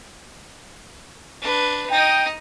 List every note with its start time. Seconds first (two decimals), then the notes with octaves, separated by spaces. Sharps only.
1.42 D4 B4
1.90 D#4 D#5 G5